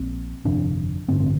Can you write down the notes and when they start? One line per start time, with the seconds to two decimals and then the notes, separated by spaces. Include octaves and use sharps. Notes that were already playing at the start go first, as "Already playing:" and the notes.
Already playing: A#1 A#2 C4
0.45 G1 F2 C3 D4
1.08 A1 G2 D3 C4
1.20 C4